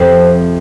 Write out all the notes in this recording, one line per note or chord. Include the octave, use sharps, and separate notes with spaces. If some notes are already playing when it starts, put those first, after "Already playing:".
Already playing: F2 C3 F3 C4